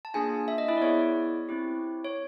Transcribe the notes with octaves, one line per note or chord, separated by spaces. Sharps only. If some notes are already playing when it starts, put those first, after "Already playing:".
A5
A#3 D4 F4 G#4 G#5
E5
D#5
E4 E5
D5
B3 E4 G#4 C#5
C4 E4 G4
C#5